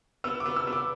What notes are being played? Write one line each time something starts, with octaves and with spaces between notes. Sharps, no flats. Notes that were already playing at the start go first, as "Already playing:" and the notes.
B3 E6
D6
B3
E6
B3
D6